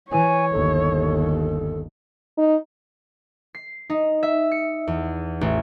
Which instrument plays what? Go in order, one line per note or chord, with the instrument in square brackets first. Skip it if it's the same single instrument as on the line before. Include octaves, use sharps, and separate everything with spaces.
[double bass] E3 [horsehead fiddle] C#5 [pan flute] G#5
[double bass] G1 D#2 [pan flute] A4
[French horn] D#4
[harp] C7
D#4
E5
C#7
E2
A1